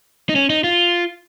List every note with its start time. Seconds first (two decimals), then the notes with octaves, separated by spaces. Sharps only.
0.29 D#4
0.36 C#4
0.50 D#4
0.64 F4